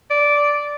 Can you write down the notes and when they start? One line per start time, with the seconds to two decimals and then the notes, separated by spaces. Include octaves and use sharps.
0.10 D5